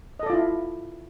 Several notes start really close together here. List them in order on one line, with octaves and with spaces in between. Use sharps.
D#5 A4 D5 F4 E4